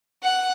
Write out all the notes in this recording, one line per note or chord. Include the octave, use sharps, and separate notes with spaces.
F#5